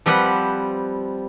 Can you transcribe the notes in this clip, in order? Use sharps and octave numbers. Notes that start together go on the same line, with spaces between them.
F3 G3 C4 G4 B4 F#5